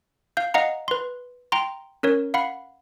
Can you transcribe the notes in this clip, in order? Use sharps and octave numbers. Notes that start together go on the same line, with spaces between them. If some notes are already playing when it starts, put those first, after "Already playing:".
F5 G6
D#5 F5 F#5 A#5
B4 C6
G5 A#5 C6
C#4 A#4 C#5
F5 F#5 B5